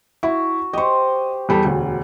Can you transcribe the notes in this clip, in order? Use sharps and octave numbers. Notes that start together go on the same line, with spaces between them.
E4 F#4
G4 C5 D#5 C#6
E2 G3 A4
E1 D2